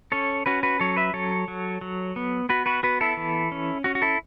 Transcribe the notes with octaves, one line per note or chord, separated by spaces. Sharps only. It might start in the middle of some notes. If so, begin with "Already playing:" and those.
C#4 A4 C#5
C#4 F#4 B4
F#4 B4
F#3 A4 C#5
B4 E5
F#3 A4 C#5
F#3
F#3
B3
B3 F#4 B4
F#4 B4
B3 F#4 B4
E4 A4
E3
C#4
C#4 F#4
F#4
E4 A4